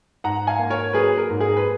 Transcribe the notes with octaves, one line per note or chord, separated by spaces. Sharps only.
G#2 F#5 A#5
F5 G#5
A#3
A#4 C#5
F#3 G#4 B4
A#4
G#2
G#4
B4